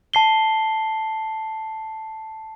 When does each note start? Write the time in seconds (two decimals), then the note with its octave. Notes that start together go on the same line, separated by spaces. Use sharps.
0.14 A5 C7 G7